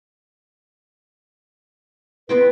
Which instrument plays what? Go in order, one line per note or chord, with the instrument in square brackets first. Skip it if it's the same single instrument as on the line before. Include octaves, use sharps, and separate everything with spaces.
[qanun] B3 C4 G5 [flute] B4